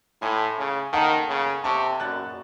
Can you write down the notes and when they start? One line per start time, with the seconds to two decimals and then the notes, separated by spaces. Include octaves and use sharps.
0.22 A2 G#5 C6
0.58 C#3
0.93 D#3 F#5 A5
1.29 C#3
1.64 C3 A5 C#6
2.00 F#2 F#6 A6